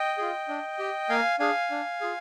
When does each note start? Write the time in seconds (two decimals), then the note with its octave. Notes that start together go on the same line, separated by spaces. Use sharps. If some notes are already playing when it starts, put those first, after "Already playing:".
Already playing: D#5 G5
0.18 F4 G#4
0.48 D4
0.79 G4
1.09 A#3 F5 G#5
1.39 D4 G#4 F5 G#5
1.71 D4
2.01 F4 G#4